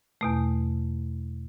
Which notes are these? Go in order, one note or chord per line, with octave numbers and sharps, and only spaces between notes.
E2 B2 A3